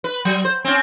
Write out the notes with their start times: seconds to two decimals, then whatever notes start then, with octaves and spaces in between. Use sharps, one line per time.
0.04 B4
0.25 F#3
0.45 C5
0.65 C4 C#4